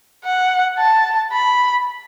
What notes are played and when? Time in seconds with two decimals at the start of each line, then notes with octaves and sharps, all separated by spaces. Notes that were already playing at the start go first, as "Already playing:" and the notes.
0.24 F#5
0.78 A5
1.32 B5